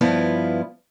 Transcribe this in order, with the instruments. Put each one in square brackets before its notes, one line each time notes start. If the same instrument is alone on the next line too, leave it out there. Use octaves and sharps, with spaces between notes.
[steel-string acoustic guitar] G2 F3 B3 E4 F4